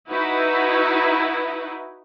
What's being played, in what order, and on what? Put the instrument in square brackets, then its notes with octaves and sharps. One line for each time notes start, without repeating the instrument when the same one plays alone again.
[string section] D#4 E4 F#4 B4